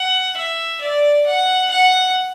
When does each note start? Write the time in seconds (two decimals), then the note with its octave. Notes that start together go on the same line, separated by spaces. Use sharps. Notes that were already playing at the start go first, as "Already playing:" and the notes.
Already playing: F#5
0.37 E5
0.81 D5
1.27 F#5
1.71 F#5